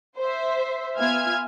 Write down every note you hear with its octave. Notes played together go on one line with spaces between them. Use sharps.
C5 E5
B3 F4 E5 G#5 F6 G#6